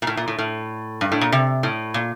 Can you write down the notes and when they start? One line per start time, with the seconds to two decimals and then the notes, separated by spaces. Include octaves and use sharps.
0.02 A#2
0.07 A2
0.17 A#2
0.28 A2
0.39 A2
1.01 G2
1.12 A2
1.21 A#2
1.32 C3
1.63 A2
1.94 A#2